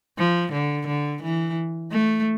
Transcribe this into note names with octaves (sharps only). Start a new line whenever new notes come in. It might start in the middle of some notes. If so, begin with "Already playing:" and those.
F3
D3
D3
E3
A3